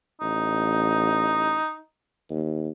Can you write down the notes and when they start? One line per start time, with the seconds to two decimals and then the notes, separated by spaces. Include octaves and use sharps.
0.21 A1 D#4
2.30 D#2